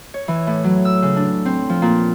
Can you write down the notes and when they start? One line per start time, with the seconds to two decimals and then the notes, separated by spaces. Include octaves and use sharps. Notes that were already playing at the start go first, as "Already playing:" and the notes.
0.14 C#5
0.28 E3
0.47 A2
0.64 F#3
0.85 E6
1.02 C#3
1.16 D4
1.45 C4
1.69 F3
1.82 A#2